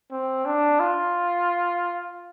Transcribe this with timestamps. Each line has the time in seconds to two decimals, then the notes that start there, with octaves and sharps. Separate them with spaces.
0.12 C4
0.46 D4
0.80 F4